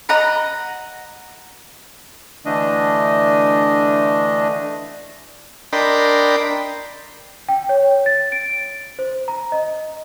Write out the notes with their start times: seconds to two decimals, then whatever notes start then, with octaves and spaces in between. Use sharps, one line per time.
0.09 D#5 F#5 A#5 B5
2.45 D3 E3 A3 D4 D#5
5.73 D4 A#4 D#5 G5 B5 C6
7.49 G5
7.69 C#5
8.06 A6
8.32 D7
8.99 C5
9.28 A#5
9.52 D#5